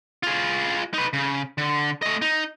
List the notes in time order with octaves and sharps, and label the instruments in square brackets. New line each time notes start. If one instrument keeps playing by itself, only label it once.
[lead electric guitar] F4 G#4
D#4 B4
C#3
D3
A3 D#5
D#4